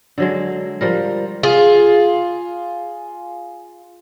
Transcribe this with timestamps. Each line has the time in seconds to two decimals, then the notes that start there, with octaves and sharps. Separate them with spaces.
0.18 D3 F#3 G#3
0.81 F3 G3 A#4
1.43 F4 G#4